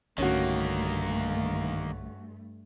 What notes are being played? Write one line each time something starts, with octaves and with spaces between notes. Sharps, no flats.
B1 G2 D3 D#3 A3 A#3 C#4 F#4